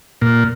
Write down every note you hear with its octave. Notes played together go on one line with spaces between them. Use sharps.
A#2